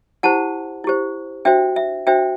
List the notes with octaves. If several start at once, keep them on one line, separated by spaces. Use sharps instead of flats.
E4 G4 C5 F#5 A5
E4 G4 C5
D4 F#4 C5 E5 G5
E5
D4 F#4 C5 E5 G5